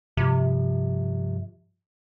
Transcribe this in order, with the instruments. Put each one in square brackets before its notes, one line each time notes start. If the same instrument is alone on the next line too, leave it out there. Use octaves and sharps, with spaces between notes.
[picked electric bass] G2 F3 [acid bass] C3